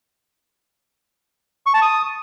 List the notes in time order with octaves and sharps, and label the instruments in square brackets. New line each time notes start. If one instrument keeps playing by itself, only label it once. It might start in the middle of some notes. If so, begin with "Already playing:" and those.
[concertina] C#6
A5
D#6